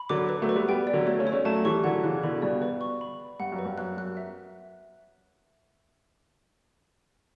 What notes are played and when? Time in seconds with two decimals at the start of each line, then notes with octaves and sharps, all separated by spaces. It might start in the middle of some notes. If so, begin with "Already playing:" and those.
Already playing: B5
0.09 D3 F#3 D6
0.29 B4
0.42 F#3 A3
0.49 B4
0.55 G3 B3
0.68 G3 B3 G5
0.87 D5
0.93 D3 F#3
1.06 F#3 A3 C#5
1.19 A3 C#4
1.27 C#5
1.32 A3 C#4
1.45 F#3 A3 A5
1.65 E3 G3 C#6
1.84 D3 F#3 F#5
2.03 C#3 E3 F#6
2.23 B2 D3 B5
2.37 C#3
2.42 G2 B2 D5
2.62 B4
2.81 C#6
3.01 B5
3.20 B5
3.40 G2 F#5
3.52 F#2
3.59 B4
3.65 G2
3.78 F#2 F#6
3.97 F#2 F#6
4.17 E5